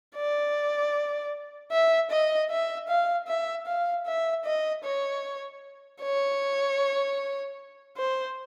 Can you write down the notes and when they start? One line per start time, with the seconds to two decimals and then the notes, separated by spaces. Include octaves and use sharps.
0.16 D5
1.72 E5
2.11 D#5
2.50 E5
2.89 F5
3.28 E5
3.67 F5
4.06 E5
4.45 D#5
4.84 C#5
6.02 C#5
7.97 C5